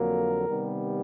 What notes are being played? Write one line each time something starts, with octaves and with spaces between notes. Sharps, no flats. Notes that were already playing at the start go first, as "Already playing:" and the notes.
Already playing: F2 D3 F#3 A#3 A#4
C3 D#3 G3 B3